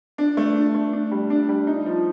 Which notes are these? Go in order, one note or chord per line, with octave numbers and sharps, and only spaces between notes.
D4
A3
D4
A3
D4
G3
D4
G3
D#4
F3